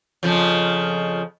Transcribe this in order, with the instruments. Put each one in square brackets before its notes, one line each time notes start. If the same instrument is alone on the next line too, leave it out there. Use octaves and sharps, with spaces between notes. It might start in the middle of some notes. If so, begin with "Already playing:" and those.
[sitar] F2 C#3 F3